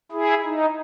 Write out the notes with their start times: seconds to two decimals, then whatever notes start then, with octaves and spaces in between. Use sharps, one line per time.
0.11 E4 G#4
0.43 D#4